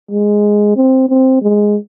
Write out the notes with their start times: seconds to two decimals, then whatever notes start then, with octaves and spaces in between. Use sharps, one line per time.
0.11 G#3
0.76 C4
1.09 C4
1.42 G#3